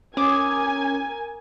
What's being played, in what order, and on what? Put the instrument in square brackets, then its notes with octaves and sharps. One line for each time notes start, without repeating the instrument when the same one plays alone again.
[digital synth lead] C#4 [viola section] A#4 G#5 [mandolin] D6 D#6